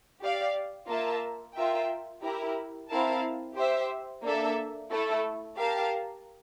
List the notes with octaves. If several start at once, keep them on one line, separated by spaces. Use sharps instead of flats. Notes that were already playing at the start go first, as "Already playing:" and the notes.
G4 D5 F5
A#3 F4 A#4 E5 A5
F4 A#4 E5 G5
E4 G4 A#4
C4 E4 A#4 F5 A5
G4 C5 E5
A#3 D4 A4 E5
A3 E4 A4
G4 A#4 F5 A5